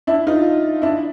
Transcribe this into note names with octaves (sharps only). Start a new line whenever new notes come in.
D4 E4
D#4 F4
D4 E4